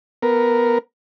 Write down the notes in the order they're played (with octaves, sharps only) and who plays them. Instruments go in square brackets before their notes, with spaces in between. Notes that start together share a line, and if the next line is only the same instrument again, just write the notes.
[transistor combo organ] B3 A#4